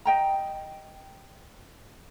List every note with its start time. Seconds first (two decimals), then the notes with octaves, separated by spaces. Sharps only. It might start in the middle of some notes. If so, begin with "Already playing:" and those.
0.05 D#5 G5 A#5